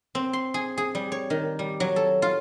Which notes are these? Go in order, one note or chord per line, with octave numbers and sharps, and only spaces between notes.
C4
C6
G#4
G#4
G3
C#5
D#3
G3
F#3
A4
F4